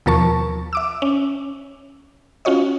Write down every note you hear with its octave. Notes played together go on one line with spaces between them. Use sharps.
D#2 B2 F3 A#4 A5 C#6
E5 D6 E6
C#4
C#4 F4 F#4 C#5 D#5